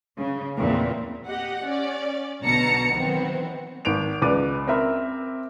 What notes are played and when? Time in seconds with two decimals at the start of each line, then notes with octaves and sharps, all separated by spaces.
0.17 C#3
0.57 E2 A#2 E3 C4
1.26 G4 D#5 F#5
1.64 C#4 D5
2.44 B1 B2 D3 A5 A#5 C#7
2.95 D#3 E3 F#3 B3 C4
3.85 G#1 D7 F7
4.22 C#2 B4 D5 D6 D#7
4.67 C4 A#4 E5 B5